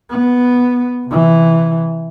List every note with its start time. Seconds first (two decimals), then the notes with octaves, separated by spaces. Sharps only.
0.11 B3
1.07 C3 E3